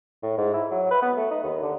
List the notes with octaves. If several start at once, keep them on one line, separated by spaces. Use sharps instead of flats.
A2
G#2
E4
F#3
B4
B3
A3
D#4
D#2
D3